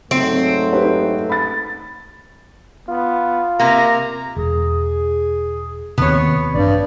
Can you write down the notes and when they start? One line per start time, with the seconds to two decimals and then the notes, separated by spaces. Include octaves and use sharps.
0.11 G#2 F#3 A3 C4
0.73 D#4 G4 B4
1.30 B5 A6
2.89 B3 F4
3.60 C3 A#3 A#5
4.36 E1 G#4
5.98 D#2 C3 B3 C#5
6.54 A1 G2 D5